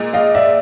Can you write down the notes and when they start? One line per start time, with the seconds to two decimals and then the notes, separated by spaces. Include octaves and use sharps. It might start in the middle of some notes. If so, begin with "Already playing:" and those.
Already playing: A#2 G#3
0.13 D#5 F5
0.34 D5 E5